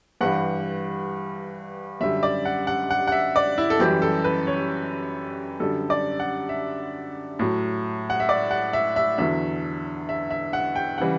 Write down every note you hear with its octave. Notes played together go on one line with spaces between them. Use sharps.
G2 E3 G3 F#5
F#2 D3 G3 E5
D5
F#5
F#5
F#5
F#5
E5
D5
E4
A4
F#2 E3 G3 G4
A4
B4
C#5
F#2 D3 G3 A4
D5
F#5
E5
A2 F#3
F#5
E5
D5
F#5
E5
E5
E2 D3 F#3 E5
E5
E5
F#5
G5
C#3 E3 G3 F#5